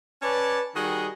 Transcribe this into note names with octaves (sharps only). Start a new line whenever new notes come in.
C#4 B4 C#5 D5 A5
D#3 G3 F#4 G#4 D#5